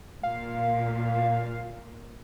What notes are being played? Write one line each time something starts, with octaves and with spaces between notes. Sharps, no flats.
A#2 F5